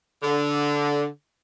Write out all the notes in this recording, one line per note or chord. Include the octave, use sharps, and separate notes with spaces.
D3